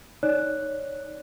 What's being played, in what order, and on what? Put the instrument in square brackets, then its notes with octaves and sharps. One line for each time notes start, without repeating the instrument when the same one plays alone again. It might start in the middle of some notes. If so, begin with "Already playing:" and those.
[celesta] D#4 C#5 D5 F#6